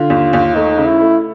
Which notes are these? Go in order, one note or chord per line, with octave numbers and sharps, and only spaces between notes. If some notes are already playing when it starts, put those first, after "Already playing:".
Already playing: D3 F4
D#2
D#2
A3 D#4
C#3
E4
A3